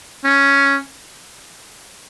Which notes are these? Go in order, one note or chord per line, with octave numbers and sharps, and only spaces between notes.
C#4